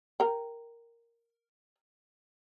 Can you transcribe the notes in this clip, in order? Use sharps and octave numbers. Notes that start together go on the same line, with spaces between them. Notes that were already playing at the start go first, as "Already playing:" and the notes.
A#4 G5